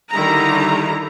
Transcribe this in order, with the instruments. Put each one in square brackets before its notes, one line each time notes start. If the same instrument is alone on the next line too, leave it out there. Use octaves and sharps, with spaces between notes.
[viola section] D3 D#3 G3 E4 A#5